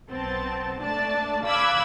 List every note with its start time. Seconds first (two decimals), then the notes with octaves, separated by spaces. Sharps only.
0.11 B1 B3 C4 A5
0.81 A3 D4 D5 A5
1.45 F5 B5 D6 E6 F#6 G#6